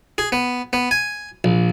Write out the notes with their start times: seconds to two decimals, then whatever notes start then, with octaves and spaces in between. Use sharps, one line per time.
0.18 G#4
0.32 B3
0.73 B3
0.91 G#5
1.44 A#1